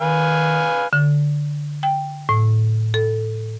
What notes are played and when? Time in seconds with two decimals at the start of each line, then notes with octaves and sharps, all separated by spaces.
0.01 D#3 B4 F5 G#5
0.93 D3
1.83 G5
2.29 A2
2.94 A4